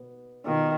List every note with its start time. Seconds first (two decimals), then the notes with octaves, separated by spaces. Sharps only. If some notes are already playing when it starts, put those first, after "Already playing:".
Already playing: B2 B3 B4
0.45 B2 D#3 B3 F4 B4